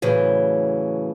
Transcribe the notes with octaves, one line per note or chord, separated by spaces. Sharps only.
A2 C#3 E3 F#3